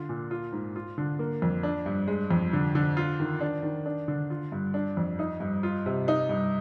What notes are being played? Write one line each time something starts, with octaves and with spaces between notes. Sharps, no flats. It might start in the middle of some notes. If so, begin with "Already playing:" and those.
Already playing: D3 F4
A#2
F4
G#2
F4
D3
A#3
F2
D4
G2
G#3
F2
D3
D3
F4
D#3
D4
D#3
D4
D3
F4
G2
D4
F2
D#4
G2
F4
C3
D#4
G2